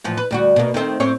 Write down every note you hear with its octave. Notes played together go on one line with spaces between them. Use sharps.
A2 E3 F3
B4
D2 G3 F#4
B2 A#3
D#3 A3 C4
A2 C4 C#5